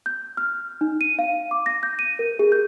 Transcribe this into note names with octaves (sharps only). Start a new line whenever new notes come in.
G6
F6
D#4
D#7
F5
D6
A#6
G6
D#7
A#4
G#4
G6